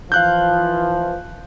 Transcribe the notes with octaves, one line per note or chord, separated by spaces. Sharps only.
E3 F3 F5 F#6 G6